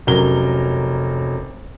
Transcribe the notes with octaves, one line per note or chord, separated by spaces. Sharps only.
F1 F#3 C#4 A#4 G7